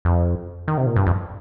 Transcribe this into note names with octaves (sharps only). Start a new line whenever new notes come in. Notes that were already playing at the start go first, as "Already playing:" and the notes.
F2
D#3
C3
A#2
G2
F2